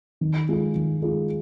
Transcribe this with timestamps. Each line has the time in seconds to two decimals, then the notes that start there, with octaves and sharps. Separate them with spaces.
0.21 D#3
0.49 G#3 F4 G#4
0.75 D#3
1.02 G#3 F4 G#4